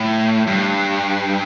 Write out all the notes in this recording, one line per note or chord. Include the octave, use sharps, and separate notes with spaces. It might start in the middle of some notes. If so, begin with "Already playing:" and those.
Already playing: A2
G2